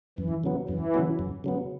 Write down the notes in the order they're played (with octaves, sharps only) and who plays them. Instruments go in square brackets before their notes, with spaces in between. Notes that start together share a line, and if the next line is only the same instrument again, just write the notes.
[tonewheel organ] F#2 [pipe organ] E3
[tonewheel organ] C#3 F#3 B3
[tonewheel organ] F#2 [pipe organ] E3
[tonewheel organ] C#3 F#3 B3
F#2
C#3 F#3 B3